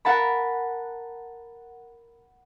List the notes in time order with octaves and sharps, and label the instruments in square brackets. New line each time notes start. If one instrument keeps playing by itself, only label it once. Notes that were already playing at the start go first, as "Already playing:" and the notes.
[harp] A#4 F#5 A5 B5